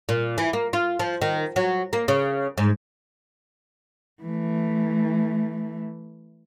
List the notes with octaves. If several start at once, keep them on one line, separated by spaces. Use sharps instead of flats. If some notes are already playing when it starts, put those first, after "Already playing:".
A#2
E3
A#3
F4
F3
D#3
F#3
A#3
C#3
G#2
E3 A3